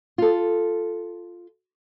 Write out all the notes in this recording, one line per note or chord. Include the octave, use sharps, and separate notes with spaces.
F4 A4